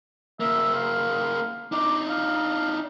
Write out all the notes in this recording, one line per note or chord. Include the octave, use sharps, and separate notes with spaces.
C#3 A#3 E5
F5
D4 D#4 D6
F5